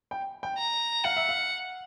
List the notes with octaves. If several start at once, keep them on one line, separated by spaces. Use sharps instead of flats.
G5
G5
A#5
F5 F#5
E5
F5